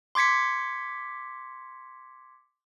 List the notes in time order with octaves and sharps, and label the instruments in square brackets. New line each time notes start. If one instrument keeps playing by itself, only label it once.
[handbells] C6 D6 G#6 B6 C#7